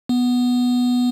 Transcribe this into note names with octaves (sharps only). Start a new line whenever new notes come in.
B3